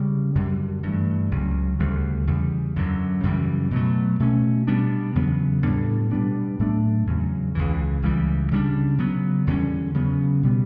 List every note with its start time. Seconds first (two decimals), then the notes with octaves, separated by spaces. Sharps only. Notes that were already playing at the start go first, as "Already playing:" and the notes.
Already playing: C#3 G3 C#4
0.35 F#2 D3 G3
0.83 G2 E3 A3
1.31 C#2 C#3 F#3
1.79 D2 C#3 G3
2.27 E2 C#3 G3
2.76 F#2 D3 F#3
3.23 F#2 C#3 E3 G3
3.71 B2 F#3 A3
4.20 B2 A3 C#4
4.67 B2 G3 B3 D4
5.15 E2 C#3 F#3 B3
5.64 A2 G3 B3 D4
6.11 B2 G3 B3 D4
6.59 A2 F#3 A3 D4
7.07 E2 C#3 F#3
7.55 C#2 C#3 E3
8.03 C#2 C#3 E3 G3
8.51 C#3 G3 B3 D4
8.99 C#3 F#3 B3
9.47 E2 D3 G3 C#4
9.94 C#3 F#3 B3
10.43 B2 G3 B3